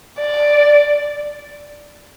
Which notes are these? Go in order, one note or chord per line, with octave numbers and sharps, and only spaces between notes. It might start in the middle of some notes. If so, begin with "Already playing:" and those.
D5